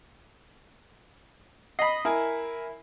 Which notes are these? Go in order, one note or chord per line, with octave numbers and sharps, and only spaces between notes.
D#5 B5 C7
E4 A#4 G#5